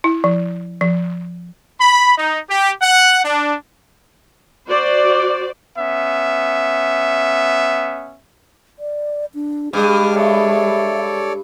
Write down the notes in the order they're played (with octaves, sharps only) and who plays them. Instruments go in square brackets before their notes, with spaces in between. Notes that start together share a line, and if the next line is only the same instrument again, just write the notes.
[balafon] E4
F3
F3
[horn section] B5
D#4
G4
F#5
D4
[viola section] F#4 C5 D5
[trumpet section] B3 C#4 E5
[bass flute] D5
D4
[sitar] G2 [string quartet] G#3 [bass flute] G#4 [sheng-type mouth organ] D6 F6
[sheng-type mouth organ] A4 C#5 D5 [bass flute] E5